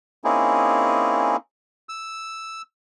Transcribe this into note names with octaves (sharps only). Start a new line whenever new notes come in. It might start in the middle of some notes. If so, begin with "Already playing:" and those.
A#3 C4 C#4 D#4 E4 G#4
E6